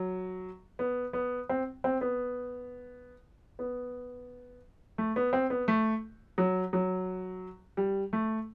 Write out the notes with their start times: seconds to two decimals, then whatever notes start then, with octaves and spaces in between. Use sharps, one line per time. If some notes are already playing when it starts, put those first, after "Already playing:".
Already playing: F#3
0.79 B3
1.13 B3
1.49 C4
1.84 C4
2.01 B3
3.59 B3
4.98 A3
5.16 B3
5.33 C4
5.50 B3
5.68 A3
6.38 F#3
6.73 F#3
7.77 G3
8.13 A3